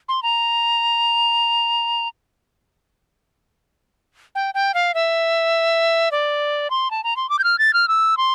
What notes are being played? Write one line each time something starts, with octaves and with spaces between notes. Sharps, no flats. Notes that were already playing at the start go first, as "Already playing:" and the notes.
C6
A#5
G5
G5
F5
E5
D5
C6
A5
A#5
C6
D6
G6
F6
A6
F6
E6
C6